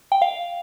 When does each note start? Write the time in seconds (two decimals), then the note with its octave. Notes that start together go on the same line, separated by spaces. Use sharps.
0.12 G5
0.22 F5